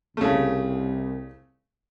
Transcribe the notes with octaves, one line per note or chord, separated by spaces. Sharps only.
C2 C#3 A3